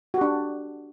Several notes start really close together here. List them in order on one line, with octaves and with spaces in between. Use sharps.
F#4 G4 D4